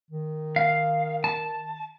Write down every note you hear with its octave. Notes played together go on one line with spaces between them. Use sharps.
D#3
F5
A5